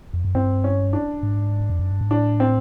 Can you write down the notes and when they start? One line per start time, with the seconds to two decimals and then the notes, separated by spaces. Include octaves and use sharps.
0.13 F2
0.25 F#2
0.35 G2 C4
0.64 C#4
0.93 D4
1.23 G#2
1.70 F2
1.79 F#2
1.90 G2
2.01 G#2
2.11 A2 D4
2.40 C4